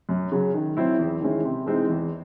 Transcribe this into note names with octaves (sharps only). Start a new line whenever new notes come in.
F#2
C#3 F#3
D#3
F#3 C4 E4
E2
D#3 G#3 C#4 E4
C3
E3 G#3 C4 D#4
E2